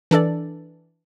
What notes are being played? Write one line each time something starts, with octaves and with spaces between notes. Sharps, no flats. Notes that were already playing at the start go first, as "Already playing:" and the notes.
E3 D4 A4 D5